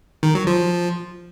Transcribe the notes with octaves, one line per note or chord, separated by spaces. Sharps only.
D#3
F#3
F3